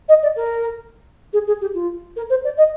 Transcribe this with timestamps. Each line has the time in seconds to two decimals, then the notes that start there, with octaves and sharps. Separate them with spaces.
0.08 D#5
0.22 D5
0.36 A#4
1.33 G#4
1.47 G#4
1.61 G4
1.74 F4
2.16 A#4
2.30 C5
2.44 D5
2.57 D#5